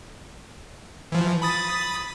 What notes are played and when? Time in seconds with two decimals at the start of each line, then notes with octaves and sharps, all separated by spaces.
1.12 E3 F3
1.42 B5 D#6 A6